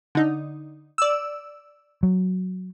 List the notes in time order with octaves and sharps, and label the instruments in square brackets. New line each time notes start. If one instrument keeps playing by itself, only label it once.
[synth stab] D3 D#4
D5 E6
[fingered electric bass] F#3